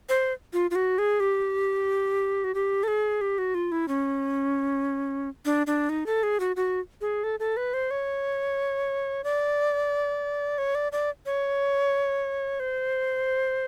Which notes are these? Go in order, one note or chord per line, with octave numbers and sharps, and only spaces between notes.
C5
F4
F4
F#4
G#4
G4
F#4
G4
A4
G#4
G4
F#4
F4
E4
C#4
D4
D4
D#4
A4
G#4
F#4
F#4
G#4
A4
A4
B4
C5
C#5
D5
C#5
D5
D5
C#5
C5